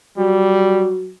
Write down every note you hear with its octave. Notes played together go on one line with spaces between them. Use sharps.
F#3 G3